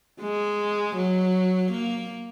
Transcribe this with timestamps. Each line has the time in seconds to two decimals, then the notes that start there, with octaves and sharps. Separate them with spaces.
0.20 G#3
0.95 F#3
1.71 A#3